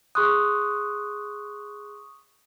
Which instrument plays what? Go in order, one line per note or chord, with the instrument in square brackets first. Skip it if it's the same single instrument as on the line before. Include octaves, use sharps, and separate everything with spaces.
[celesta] G#4 C6 F#6 [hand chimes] C#6 D#6